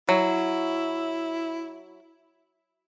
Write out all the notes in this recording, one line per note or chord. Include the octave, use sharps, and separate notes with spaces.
F#3 E4